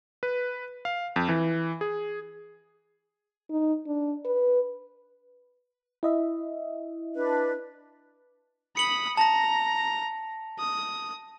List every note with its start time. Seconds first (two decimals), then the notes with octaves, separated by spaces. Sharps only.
0.23 B4
0.85 F5
1.16 F2
1.29 E3
1.81 G#4
3.50 D#4
3.87 D4
4.25 B4
6.03 E4 D#5 E5
7.15 D4 B4
8.77 B5 D#6 C#7 F#7
9.17 A5 A#5 A#6
10.59 D#6